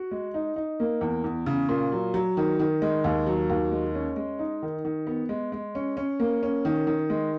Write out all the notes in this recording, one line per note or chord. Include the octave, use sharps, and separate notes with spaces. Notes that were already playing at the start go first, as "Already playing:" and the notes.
Already playing: F#4
G#3
D#4
D#4
A#3
E2
E2
C#3
A#2
F#3
F#3
D#3
D#3
G#3
D#2
F#3
D#2
G#3
C#4
G#3
D#4
D#3
D#3
B3
G#3
G#3
C#4
C#4
A#3
C#4
D#3
D#3
G#3